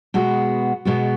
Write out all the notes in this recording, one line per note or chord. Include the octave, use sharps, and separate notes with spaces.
B2 G#3 B3 F#4
B2 G#3 B3 F#4